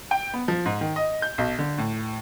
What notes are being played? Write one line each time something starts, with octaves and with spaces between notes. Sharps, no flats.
G5
B3
F3
G#2
D#3
D#5
G6
B1
D3
A2